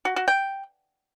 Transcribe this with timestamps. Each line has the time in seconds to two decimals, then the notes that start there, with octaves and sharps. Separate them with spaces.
0.05 F#4
0.16 F#4
0.28 G5